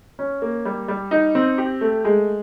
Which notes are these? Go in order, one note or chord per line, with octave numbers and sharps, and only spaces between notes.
C#4
A#3
G3
G3
D#4
C4
G4
A3
G#3